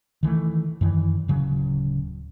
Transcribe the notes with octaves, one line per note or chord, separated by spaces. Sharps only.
D#3 E3 G3 A3
F#2 D#3 E3
D1 C#3 F#3